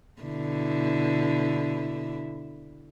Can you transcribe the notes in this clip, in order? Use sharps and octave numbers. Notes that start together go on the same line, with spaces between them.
B2 D3 E4